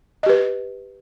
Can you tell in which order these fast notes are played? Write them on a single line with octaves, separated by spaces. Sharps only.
D#5 G4 B4